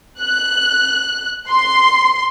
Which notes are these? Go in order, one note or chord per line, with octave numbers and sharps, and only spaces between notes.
F#6
C6